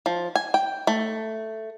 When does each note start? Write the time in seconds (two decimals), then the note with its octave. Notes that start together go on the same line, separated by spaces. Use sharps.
0.06 F3
0.36 G#5
0.54 G5
0.87 A3